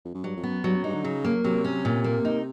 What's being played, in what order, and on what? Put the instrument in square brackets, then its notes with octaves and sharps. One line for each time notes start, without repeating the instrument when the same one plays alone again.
[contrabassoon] F2
F#2
[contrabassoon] G2 [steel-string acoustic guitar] F#3
[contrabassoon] F2
[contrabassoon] F#2 [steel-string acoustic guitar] B3
[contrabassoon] G2 [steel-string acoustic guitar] F#3
[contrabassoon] F#2
[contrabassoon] G2 [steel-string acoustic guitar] D#4
[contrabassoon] D3
[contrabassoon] C#3 [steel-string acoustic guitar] F#3
[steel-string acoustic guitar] A#3
[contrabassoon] C3 [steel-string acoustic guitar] F#3
[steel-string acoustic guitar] C#4
A#2
A#3
D#4